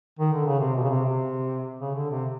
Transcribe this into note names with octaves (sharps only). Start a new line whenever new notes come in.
D#3
D3
C#3
C3
B2
C#3
C3
C3
C#3
D3
C3